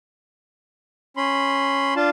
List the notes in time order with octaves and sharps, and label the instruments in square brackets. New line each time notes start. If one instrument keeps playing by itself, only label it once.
[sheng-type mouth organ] C#4 B5 C6
D4 F4 F5 A5